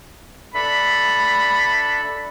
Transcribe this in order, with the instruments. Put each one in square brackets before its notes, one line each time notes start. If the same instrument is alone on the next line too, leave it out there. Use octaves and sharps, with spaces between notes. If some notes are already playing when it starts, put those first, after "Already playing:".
[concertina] D4 A4 E5 [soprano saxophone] B5